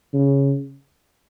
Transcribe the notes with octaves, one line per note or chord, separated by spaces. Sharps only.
C#3